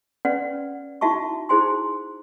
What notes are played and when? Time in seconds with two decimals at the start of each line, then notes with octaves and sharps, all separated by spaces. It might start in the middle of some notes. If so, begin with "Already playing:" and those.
0.25 C#4 B4 D5 F#5
1.01 D#4 E4 F#4 E5 A5 C#6
1.49 D#4 E4 G#4 C5 G#5 C6